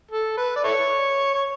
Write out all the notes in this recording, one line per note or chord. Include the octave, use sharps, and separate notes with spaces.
A4
B4
D5
E4 A4 C#5
C#5